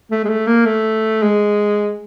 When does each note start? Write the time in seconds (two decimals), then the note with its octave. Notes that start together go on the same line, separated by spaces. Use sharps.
0.11 A3
0.25 G#3
0.29 A3
0.47 A#3
0.66 A3
1.23 G#3